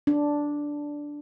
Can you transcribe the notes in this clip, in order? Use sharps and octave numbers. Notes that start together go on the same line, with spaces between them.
D4